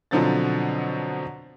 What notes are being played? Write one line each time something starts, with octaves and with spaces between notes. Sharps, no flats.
B2 D3 F3 F#3 C4 A6